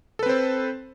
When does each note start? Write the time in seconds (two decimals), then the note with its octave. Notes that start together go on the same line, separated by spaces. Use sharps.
0.19 A4
0.23 B4
0.26 C4
0.29 C5